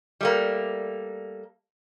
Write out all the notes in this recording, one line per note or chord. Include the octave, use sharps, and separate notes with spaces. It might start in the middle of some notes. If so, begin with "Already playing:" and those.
G3 A3 A#3